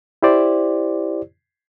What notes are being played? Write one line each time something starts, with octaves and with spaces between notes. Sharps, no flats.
E4 G4 C5 D5